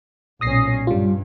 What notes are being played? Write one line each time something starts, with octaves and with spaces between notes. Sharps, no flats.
B1 A#2 C#4 D#6 A#6 C7
G2 G3 F4